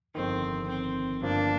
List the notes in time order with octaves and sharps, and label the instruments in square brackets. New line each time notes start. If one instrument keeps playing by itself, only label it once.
[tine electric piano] G1 F2 D#3 [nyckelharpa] C4
[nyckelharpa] C4
[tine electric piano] G1 G2 F3 A#3 [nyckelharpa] D4